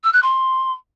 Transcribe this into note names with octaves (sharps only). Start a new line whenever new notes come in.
E6
F#6
C6